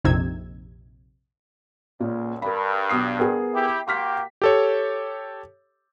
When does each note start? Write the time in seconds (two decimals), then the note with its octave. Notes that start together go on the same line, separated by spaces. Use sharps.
0.04 A#1 F2 C3 D#4 E6 G#6
2.00 C#2 A#2
2.42 G2 A#4 B5
2.89 B1 D#6 C7
3.19 B3 G#4 A#4
3.54 E4 G4
3.88 A#3 F#4 G4 C6 F6 B6
4.42 G4 A4 C#5